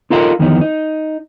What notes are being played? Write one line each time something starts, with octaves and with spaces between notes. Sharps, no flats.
D#4 F4 A4 A#4 D#5 F5
F2 D#3 E3 B3 D#4
D#4